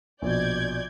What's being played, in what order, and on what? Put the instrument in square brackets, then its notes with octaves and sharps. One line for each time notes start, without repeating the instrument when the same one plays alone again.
[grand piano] A#1 B2 [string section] D5 G6 G#6